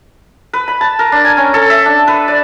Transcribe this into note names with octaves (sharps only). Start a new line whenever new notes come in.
B4
B5
A5
A#4
D4
G#5
C#4
A4
E5
D4
B4
D5